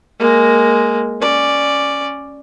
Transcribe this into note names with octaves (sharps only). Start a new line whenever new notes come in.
G#3 A#3
C#4 D5